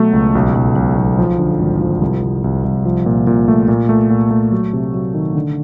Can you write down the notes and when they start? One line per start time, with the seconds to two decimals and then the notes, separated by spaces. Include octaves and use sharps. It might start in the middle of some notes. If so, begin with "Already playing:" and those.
Already playing: B2 F#3 A3
0.13 C#2
0.35 B1
0.55 B1
0.76 B1
0.97 B1
1.18 F3
1.38 D3
1.59 G#1
1.81 F3
2.01 C2
2.22 C2
2.44 C2
2.65 C2
2.85 F3
3.06 A#2
3.27 A#2
3.48 A3
3.68 A#2
3.89 A3
4.10 A#2
4.31 A3
4.52 F#3
4.73 C3
4.94 F#3
5.14 D#3
5.35 D3